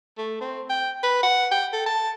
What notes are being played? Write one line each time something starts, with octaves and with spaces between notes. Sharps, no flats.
A3
C4
G5
B4
F#5
G5
A4
A5